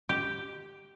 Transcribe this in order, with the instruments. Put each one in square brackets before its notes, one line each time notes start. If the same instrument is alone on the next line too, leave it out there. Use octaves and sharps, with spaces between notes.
[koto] G4